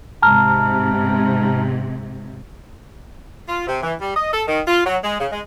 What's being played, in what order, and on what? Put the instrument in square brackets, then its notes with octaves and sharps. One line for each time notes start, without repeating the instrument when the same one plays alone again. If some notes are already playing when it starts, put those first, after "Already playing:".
[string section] G#2 C3 [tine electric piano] A5 A#5 F6
[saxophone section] F4
C3
E3
G3
D#5
A4
D#3
F4
F#3
G#3
C#3
G#3